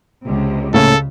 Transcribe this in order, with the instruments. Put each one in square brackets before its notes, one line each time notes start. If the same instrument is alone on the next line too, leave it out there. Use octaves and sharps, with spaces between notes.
[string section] C#2 C3
[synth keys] A2 A#3 C#4 [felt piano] C#3 [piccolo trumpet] A4